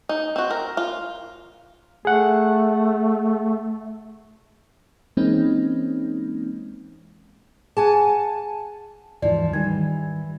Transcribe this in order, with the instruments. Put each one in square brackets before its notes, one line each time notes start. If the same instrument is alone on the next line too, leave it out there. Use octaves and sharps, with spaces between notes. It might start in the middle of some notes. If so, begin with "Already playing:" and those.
[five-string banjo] D#4
C4 F#4
A#4
F4
[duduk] A3 [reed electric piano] G#4 F#5
[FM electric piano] E3 G#3 A#3 C4 C#4 D#4
[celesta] G#4 [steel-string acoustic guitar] F#5 G#5 A5
[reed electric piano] D#2 G#2 E3 [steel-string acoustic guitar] F3 [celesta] D5
[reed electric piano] D#3 G3 [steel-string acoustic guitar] E3 [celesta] G#6